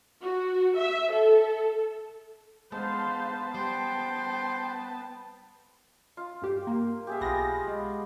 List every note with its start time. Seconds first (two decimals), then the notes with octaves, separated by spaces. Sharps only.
0.22 F#4
0.77 E5
1.12 A4
2.72 G#3 B3 C5 F5 A5
3.55 G3 C5 G5
6.17 F4
6.42 G2 G4
6.67 A#3
7.07 G4 G#4 E5
7.21 B1 B3 F4 A#6
7.68 G#3